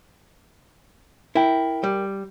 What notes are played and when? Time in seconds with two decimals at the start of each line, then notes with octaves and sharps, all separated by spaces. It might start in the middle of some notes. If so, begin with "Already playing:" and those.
1.35 E4 A#4 G5
1.84 G3